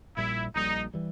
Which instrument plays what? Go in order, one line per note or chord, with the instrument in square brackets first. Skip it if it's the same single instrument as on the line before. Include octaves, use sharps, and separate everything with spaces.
[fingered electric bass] A#1 A#2 G3 [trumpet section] E4
[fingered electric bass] A#1 A#2 G3 [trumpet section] D#4
[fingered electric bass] E3 G3